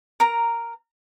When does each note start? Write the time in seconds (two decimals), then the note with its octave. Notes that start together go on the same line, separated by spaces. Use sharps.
0.20 A#4 A#5